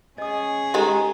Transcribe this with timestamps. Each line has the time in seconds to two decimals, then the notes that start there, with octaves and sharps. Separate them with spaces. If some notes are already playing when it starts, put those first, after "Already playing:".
0.18 C#4 G#4 D#5 D#6
0.74 D#3 G#3 G4 A4 A#5